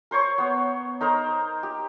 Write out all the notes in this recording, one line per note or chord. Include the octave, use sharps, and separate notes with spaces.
A#4 C5 C#5 C#6
B3 C#5
D#4 A#4 C5 A#5
G4